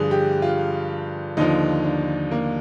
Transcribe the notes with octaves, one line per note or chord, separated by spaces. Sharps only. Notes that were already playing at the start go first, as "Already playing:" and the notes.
Already playing: G2 D3 F3 G#4
G4
F4
D#2 D3 F3 D#4
D4
A#3